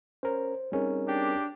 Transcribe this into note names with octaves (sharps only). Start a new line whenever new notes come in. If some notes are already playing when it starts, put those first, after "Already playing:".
C#4 A#4 C5
G3 C4 C#4 D#4 G#4 A#4
D4 G4